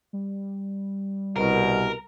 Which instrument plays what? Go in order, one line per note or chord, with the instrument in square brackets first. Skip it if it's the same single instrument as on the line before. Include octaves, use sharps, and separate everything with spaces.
[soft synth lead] G3
[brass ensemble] C2 B2 [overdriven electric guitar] A#4